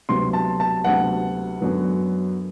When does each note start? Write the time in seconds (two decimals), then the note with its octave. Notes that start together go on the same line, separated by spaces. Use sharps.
0.09 D2 C3 F#3 B3 C6
0.33 A5
0.60 A5
0.84 D2 C3 F#3 B3 F#5
1.60 F#2 D3 F#3 B3